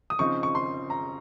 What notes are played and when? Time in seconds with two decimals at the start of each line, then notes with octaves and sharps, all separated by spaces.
0.10 D#6
0.19 C#3 F3 C4 D#4 C#6
0.43 C#6
0.55 C6
0.90 A#5